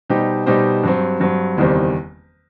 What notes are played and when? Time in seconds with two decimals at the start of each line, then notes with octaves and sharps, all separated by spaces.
0.09 B2 G3 D#4 G4 C5
0.46 B2 G3 D#4 G4 C5
0.83 G2 F#3 C4
1.20 G2 F#3 C4
1.57 F#1 E2 D#3 G3 C4